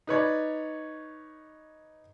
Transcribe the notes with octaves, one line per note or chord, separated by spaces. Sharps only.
D#4 B4 C#5 D5